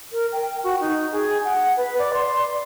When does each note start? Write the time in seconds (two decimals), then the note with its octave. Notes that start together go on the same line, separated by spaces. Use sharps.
0.13 A#4
0.32 G5
0.64 F#4
0.81 D#4
1.12 G#4
1.44 F#5
1.77 B4
1.99 D5
2.14 C6